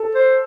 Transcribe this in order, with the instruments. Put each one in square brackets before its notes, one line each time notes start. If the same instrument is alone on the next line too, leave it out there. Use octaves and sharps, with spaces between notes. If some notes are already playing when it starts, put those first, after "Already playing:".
Already playing: [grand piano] A4
[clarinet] C5